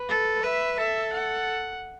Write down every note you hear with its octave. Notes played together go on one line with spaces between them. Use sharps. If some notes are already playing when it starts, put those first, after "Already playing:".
Already playing: B4
A4
B4 E5
A4 E5
F#5